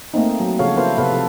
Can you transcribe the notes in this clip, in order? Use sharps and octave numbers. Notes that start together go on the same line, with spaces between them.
A3 A#3 C4 D#4
F#3
C#3 F3 F#4 A4 C#5 F5
B3 E4 A4 A#4 C5 F5
C3 B3 A4 B4 F5
F3 A4